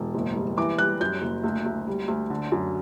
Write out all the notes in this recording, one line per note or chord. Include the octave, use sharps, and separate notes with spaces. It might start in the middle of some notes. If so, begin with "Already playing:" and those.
Already playing: E1
F#1
G3
E3 D6
G3 F#6
F#2 G6
F#1
D2
D2
G3
D2
D3
F#2